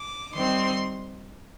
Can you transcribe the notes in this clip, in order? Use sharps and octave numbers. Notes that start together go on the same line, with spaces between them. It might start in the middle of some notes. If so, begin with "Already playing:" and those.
Already playing: D6
D#3 G3 C4 C6